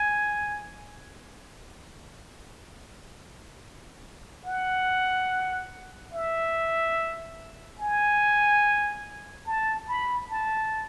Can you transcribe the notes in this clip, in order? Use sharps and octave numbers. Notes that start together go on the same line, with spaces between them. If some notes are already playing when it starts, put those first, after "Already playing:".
Already playing: G#5
F#5
E5
G#5
A5
B5
A5